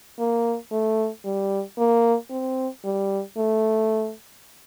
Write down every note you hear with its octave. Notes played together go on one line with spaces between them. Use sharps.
A#3
A3
G3
A#3
C4
G3
A3